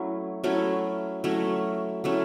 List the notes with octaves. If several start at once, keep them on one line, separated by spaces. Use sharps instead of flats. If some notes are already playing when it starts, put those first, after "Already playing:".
Already playing: F#3 A3 C#4 E4
F#3 A3 C#4 E4
F#3 A3 C#4 E4
F#3 A3 C#4 E4